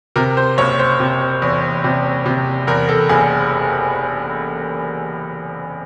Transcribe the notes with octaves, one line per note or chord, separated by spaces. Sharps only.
C3 A#4
C5
F#1 C#5
C5
C3
E2
C3
C3
E2 A#4
A4
F#1 G#4